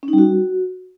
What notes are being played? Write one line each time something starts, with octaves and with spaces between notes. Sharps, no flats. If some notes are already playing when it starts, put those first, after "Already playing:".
C#4
D#4
G3
F#4